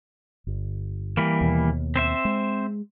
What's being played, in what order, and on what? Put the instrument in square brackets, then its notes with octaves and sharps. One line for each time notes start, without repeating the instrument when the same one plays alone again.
[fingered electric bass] G1
[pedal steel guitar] E3 G3 A#3
[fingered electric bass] D#2 B2
[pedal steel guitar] C4 C5 E5
[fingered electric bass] G#3